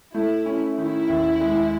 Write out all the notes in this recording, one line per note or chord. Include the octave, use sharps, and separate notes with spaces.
A3 E4
C#4
D#3 E4
D#2
G#3